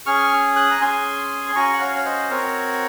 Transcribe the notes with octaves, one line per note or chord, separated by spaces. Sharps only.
C#4 G#4 C#6 F6
D#6 F#6
A#5
C#4 G#4 G#5 C6
C6
C#4 F#4 A#5 C#6
F#5
C#5 F5
C#5
C5 D#5
C4 F#4 A#4 C#5